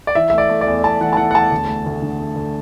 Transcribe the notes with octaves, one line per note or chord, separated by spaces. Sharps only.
D5
E3 E5
E5
A3 D5
A3
D5
E2
E2 A5
E3 F#5
A5
E3 F#5
F#5
E2 A5
D2
A3
D2
D3
A3
D2